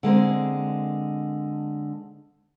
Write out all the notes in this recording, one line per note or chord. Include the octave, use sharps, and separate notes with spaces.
D3 G#3 A#3 C4